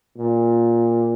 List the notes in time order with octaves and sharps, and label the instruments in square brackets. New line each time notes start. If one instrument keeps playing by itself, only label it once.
[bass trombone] A#2